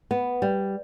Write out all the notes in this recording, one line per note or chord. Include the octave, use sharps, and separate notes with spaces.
B3
G3